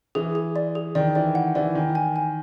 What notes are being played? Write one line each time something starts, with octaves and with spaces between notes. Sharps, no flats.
E3 G#4
G#4
D5
G#4
D#3 D5
E3 D5
F#5
E3 D5
D#3 G#5
G#5
G#5